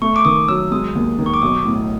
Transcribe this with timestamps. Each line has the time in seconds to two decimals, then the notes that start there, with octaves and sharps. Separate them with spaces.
0.02 A3 C#6
0.16 D6
0.25 D#3 D#6
0.48 F#3 E6
0.72 G#3 D#6
0.95 D#2
1.19 D#3
1.26 C#6
1.34 D6
1.42 B1 D#6
1.65 A2